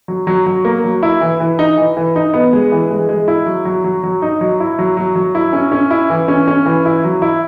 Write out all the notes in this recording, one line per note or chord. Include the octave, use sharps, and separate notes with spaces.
F#3
F#3
F#3
A#3
F#3
E4
E3
E3
D#4
E3
E3
D#4
B3
G#3
E3
G#3
G#3
E4
F#3
F#3
F#3
F#3
D#4
F#3
E4
F#3
F#3
F#3
E4
C#4
C#4
E4
E3
C#4
C#4
E3
E4
F#3
E4